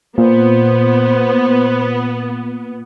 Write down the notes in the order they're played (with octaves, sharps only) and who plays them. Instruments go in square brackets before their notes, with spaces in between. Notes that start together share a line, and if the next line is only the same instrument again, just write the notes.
[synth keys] A#2 [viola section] B3 [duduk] C5